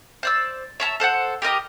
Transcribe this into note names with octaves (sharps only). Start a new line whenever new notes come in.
C5 D5 E6
C#5 E5 A5 A#5
A4 C5 D5 F#5
G4 A#4 D#5 A#5